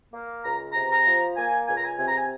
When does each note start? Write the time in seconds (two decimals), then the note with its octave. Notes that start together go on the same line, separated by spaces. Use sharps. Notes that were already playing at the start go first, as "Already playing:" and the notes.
0.13 A#3
0.44 C#2 A#5
0.72 C3 A#5
0.90 A#5
1.06 F3
1.36 A#3 G#5
1.67 C#2 G#5
1.76 A#5
1.85 G#5
1.98 C3 G#5
2.07 A#5
2.17 G#5